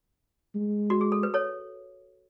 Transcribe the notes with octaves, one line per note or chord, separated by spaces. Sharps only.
G#3
F#4
G#4
A4
B4
A4 C#5